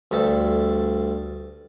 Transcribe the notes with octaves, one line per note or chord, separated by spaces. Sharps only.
D2 G2 A4 A5